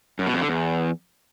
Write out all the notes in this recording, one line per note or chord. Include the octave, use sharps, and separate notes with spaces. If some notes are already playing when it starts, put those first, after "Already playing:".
F#2
B2
F2
D3
E2